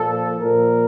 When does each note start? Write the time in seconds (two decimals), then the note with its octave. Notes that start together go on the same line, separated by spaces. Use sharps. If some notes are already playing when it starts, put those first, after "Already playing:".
Already playing: A#2 F3 A4
0.40 A#2 F3 A#4